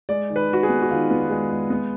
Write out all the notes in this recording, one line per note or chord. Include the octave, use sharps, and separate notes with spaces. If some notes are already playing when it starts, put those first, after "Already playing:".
G#3 D5
D#3
B4
D#3 F#4
G#4
B3
F#4
D#3 F4
B3
G#3
G#3
B3